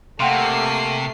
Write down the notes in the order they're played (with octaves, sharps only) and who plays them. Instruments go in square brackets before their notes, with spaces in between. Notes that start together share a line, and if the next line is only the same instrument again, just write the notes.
[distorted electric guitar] C3 [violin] A3 C7 [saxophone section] A#3 [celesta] F#5 G5 C6